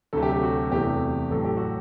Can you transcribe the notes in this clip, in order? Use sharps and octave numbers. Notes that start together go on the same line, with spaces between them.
D2 C3 F#3 A3 A4
G4
G4
F#4
E2 C3 E3 A3 G4
A1 A2 F#3 A4
G4
F#4